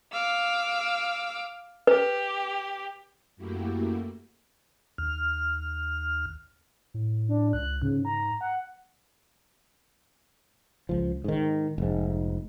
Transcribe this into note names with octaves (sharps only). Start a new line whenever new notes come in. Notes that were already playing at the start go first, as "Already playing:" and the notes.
F5 D6 E6
G4 B4
F#2 A3 A#3 E4 F#4 G4
D#2 F6
A2
D4
C#2 F#6
G#2 C#3
A#5
F#5
C#2 F3
G#2 D#3
F1 G#2